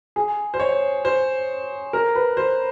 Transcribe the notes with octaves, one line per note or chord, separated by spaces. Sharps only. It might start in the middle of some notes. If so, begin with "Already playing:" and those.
G#4
C5
C#5
C5
A#4
B4
C5